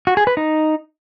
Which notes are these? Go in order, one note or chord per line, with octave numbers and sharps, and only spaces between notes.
F#4
G#4
B4
D#4